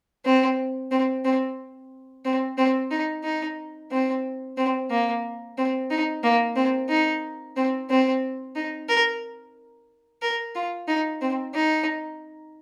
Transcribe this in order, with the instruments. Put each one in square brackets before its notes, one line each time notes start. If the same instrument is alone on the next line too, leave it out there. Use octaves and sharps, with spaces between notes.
[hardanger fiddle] C4
C4
C4
C4
C4
D#4
D#4
C4
C4
A#3
C4
D#4
A#3
C4
D#4
C4
C4
D#4
A#4
A#4
F4
D#4
C4
D#4